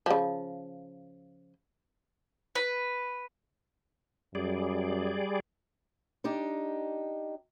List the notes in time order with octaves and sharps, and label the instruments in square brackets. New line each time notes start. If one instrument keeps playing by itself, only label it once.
[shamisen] C#3 F3
[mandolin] B4
[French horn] F#2 [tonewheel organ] G3 G#4 D5
[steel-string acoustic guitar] D4 D#4 G4